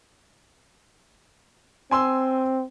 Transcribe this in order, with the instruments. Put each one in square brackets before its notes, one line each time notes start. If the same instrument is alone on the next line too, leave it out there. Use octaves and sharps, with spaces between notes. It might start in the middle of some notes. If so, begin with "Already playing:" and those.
[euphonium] C4 [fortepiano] G#5 C6 E6